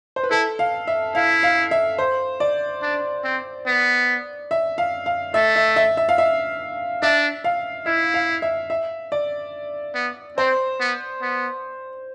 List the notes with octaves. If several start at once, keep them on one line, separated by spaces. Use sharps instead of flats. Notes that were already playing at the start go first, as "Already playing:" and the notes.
C5
B4
E4 A4
F5
E5
E4 F5
F5
E5
C5
D5
D4
C4
B3
E5
F5
F5
A3 E5
E5
E5
E5
F5
E5
D4 E5
F5
E4 E5
F5
E5
E5
D5
B3
C4 C5
B3
B3